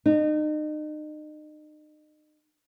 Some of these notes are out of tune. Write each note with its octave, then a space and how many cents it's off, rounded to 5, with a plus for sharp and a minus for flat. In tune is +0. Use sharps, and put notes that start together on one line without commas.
D#4 -35